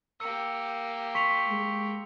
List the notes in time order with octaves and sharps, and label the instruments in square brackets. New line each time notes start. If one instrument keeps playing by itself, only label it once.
[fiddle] A#3 G4 [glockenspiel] E6 C#7
[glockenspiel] C6 C#7 F7 [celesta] C#6 B6
[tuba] G#3